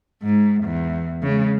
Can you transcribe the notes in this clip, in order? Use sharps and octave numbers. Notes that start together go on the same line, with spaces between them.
G#2
E2
C#3 G#3